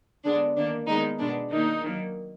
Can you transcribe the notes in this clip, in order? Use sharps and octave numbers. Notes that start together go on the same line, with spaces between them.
D3 G#3 B3 D4
D#3 A#3 D4
D#3 G#3 B3 D#4
B2 G#3 B3 D4
D#3 A#3 D#4
D#3 F#3 A#3